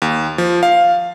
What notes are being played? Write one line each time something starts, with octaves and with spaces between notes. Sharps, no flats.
D#2
F3
F5